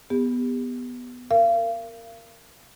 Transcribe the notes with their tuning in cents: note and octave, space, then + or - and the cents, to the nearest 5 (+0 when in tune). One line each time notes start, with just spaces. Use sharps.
B3 +0 G4 +35
A#4 -15 F5 -35